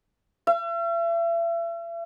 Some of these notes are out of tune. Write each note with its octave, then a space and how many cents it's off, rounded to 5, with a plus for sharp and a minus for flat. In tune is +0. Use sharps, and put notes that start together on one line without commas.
E5 +40